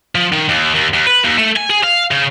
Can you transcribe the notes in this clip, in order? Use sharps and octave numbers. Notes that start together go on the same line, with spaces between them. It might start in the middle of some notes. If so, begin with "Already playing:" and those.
F3
D#3
D#2
D#2
D#2
B4
D#2
A3
G#5
G#4
F5
C#3